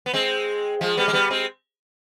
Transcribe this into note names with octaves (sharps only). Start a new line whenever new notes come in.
B3
G#3 C4
F3 G#3
G3 B3
G#3
G3 B3
G#3 C4